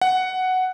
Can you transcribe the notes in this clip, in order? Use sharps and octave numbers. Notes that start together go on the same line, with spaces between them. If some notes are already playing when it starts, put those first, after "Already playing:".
F#5